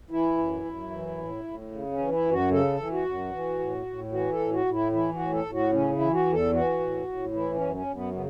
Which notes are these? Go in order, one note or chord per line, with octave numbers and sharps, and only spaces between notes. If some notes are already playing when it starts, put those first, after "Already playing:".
E3 E4
F#2
F#2
E3
A2
A2
C#3
C#4
E3
E4
F#2
F#4
C#3 A4
E3
F#4
F#2
E3
A2
A2
E3 F#4
A4
A2
F#4
A2
E4
E3 E4
F#4
A2
A4
A2
F#4
C#3 C#4
E4
E3
F#4
E2
A4
E3 F#4
A2
A2
E3 E4
C#4
F#2
C#4
F#2
B3
C#3 B3